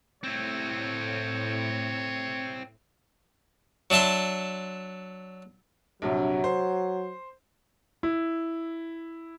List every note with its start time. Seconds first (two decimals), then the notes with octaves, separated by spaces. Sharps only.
0.23 A2 C4 E4 C#5
3.90 F#3 D4 E5 A5 C6
6.02 A#1 G2 C3 F#3
6.44 C5
8.03 E4